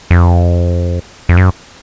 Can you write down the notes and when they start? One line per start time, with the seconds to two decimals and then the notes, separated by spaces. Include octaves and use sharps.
0.11 F2
1.29 F2
1.37 F#2